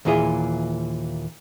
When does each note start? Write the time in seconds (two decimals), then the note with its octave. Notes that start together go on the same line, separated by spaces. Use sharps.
0.05 D#2 A#2 E3 F4 G#4 E5